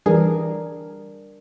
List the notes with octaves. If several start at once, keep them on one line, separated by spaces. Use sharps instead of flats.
E3 G3 D4 G#4 A#4